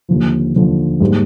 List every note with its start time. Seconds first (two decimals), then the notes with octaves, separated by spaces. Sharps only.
0.09 D#2 D3 F3
0.55 D#2 D3 F3
1.00 G#2 G3 A#3